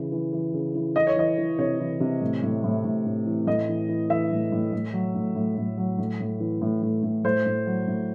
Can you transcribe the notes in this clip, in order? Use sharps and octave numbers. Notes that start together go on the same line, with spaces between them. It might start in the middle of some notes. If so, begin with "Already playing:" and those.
Already playing: C#3 E3
E3
E3
C#3
E3
E3 D#5
C#5
E3 D#5
E3
C3 C#5
E3
C3
A2
A2
A2
A2
A2
E3
A2 D#5
E3
E3
E3 E5
A2
A2
A2
F#3
A2
A2
A2
F#3
A2
A2
E3
A2
A2
A2
A2 C5
A2
F#3
A2